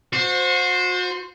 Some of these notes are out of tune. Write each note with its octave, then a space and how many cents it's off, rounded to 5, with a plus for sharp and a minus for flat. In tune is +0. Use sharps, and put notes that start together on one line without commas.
F#4 -35 C5 +0